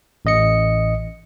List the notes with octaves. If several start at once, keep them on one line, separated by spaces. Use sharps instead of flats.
A1 D#5 C#7